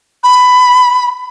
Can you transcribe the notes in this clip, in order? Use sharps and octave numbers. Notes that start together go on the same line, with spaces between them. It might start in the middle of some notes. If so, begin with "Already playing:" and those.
B5